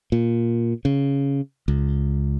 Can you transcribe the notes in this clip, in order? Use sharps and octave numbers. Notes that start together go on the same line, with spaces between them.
A#2
C#3
C#2